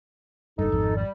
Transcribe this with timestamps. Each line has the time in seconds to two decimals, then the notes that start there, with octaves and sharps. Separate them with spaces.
0.59 F#1 G2 D#4 A4
0.72 G#1 F2
0.96 G3